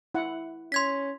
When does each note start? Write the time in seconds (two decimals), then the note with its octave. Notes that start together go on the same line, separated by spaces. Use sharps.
0.15 E4 F#5
0.72 C#4 C6 G#6 B6